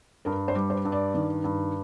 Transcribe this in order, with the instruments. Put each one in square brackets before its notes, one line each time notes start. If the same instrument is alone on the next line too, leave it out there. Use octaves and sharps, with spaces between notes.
[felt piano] G2 A#4
C5
G3
C5
G2
D5
D#3
G2